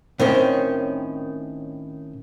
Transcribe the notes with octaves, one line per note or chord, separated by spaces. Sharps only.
A2 D#3 C4 C#4